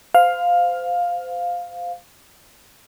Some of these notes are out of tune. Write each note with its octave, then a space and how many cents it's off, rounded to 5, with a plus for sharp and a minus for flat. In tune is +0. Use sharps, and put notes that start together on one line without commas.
C5 -30 F5 +10